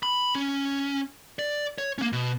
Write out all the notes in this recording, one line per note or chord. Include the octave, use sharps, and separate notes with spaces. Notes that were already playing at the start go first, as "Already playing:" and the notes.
B5
C#4
D5
C#5
A#3 C#4
B2